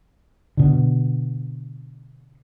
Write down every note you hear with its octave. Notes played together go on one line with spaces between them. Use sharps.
B2 D3